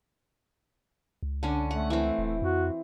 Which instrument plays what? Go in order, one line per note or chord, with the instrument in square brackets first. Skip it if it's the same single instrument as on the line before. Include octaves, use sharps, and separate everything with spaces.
[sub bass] C#2
[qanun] D3 C#4 [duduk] D4
[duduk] A3 [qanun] F#5
[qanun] E3 C4
[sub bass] D#1
[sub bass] F2 [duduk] F#4